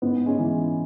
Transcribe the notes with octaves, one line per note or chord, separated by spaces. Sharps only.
G#2 B3
G#3 C#4
E3